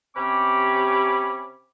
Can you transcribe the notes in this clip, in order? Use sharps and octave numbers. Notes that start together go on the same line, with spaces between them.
C3 C#4 G4 B5 D6